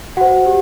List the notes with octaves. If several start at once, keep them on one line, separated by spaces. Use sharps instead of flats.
F#4 C5 F#5
G4